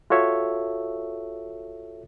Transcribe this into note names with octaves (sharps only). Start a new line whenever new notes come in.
F4 F#4 A4 C#5 E5